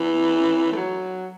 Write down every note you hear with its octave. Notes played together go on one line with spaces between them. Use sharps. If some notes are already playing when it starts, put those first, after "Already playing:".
Already playing: E3
A3
F#3